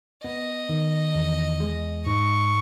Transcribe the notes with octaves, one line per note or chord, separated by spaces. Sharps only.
B3 D#5
D#3
E2
G#3
G#2 C#6